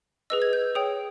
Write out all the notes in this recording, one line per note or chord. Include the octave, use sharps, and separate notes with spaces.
G#4 B4 D#5 E6
G#6
G6
G#4 C#5 G5 D#6